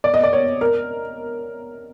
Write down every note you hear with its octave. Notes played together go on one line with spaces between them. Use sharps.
D5
D#5
D5
C#5
A#4